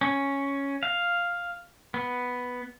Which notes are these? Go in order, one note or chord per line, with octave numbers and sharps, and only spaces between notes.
C#4
F5
B3